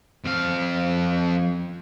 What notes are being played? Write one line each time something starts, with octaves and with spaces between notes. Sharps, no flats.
F2 F5